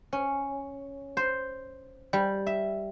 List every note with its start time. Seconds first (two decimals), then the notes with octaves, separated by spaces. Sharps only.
0.13 C#4
1.17 C5
2.13 G3
2.47 E5